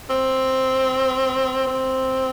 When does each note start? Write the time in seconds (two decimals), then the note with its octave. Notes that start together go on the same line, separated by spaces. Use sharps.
0.10 C4
1.67 C4